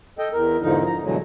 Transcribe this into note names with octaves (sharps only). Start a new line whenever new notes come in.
A4 D#5 G5
E2 A#4
E2 G#2 D3 F3 D#4
A#5
G2 B2 D3 E3 F#3 G#3